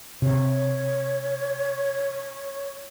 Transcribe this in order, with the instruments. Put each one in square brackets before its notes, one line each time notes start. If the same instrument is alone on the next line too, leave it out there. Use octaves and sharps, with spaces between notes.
[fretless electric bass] C3 [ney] C#5